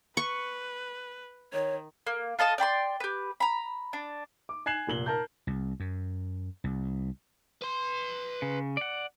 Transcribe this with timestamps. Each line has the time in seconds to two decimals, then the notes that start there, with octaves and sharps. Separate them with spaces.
0.17 B4 C#6
1.53 D#3 C#5
2.07 A#3
2.39 F4 A4 D#5 A5
2.58 D5 G5 B5 C6
3.00 G4 B4
3.40 A#5 B5
3.93 D4
4.49 D6
4.66 G#5 F#6 G#6 C7 E7 F#7
4.87 F1 A#2 F#7 G7
5.06 A#4 A5 G6
5.47 C2
5.80 F#2
6.64 C2
7.62 B4 C6
8.42 C#3
8.77 D5 F#5